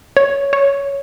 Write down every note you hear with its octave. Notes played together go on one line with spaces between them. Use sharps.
C#5
C#5